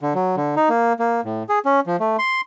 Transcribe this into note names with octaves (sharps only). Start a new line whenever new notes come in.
D3
F#3
D3
D#4
A#3
A#3
A2
G#4
C#4
F3
A3
C6